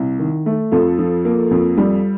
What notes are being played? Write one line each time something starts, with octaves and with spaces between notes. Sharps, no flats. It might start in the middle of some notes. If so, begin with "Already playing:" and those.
Already playing: C2
D#3
A3
F2 F4 A4
F3
A#3
F2
G3